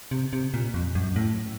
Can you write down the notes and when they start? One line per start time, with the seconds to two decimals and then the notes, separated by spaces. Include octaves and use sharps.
0.11 C3
0.33 C3
0.54 A#2
0.74 F2
0.95 F#2
1.16 A2